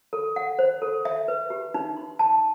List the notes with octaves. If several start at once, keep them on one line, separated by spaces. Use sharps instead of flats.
A4
F#5
C5
A4
E5
B4
G4
D#4
C6
A5